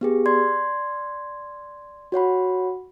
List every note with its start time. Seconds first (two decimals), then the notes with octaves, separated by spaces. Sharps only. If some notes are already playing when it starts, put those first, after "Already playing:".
0.01 B3 G4 G#4
0.26 D5 C6 G#6
2.12 F#4 C#5 F#5 B5